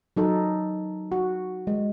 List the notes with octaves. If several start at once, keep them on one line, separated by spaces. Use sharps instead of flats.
F#3 D#4 A4
F#4
G#3